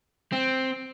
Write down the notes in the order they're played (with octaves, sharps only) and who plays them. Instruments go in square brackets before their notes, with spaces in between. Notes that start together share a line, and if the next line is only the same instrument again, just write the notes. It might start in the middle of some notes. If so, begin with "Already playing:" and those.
[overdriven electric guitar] C4